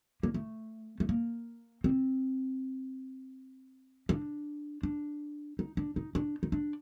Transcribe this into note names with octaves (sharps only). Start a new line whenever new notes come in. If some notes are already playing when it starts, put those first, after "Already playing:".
A#3
A3
A3
A#3
C4
D4
D4
D#4
D4
D#4
D4
D#4
D4